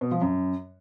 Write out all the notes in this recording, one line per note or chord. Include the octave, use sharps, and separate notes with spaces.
B2
F3
F#2